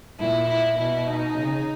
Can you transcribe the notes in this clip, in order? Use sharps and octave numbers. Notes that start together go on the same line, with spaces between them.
A#2 E4
E4
B2 E4
D#4
C#3